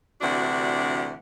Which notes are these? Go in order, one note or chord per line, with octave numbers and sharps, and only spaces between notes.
D2 C3 E3 D4 F#4 F#5